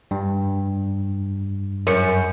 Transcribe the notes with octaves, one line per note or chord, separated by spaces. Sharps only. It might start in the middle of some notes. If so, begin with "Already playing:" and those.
G2
F#2 A#4 C#7